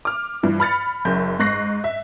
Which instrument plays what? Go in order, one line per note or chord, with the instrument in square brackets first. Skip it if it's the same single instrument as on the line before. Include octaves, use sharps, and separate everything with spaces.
[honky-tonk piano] D6 F6
G2 E3 F3
B5 F6 A6 C#7
F#1 F#2 G6
G#2 C#6 F#6 A#6 C7
E5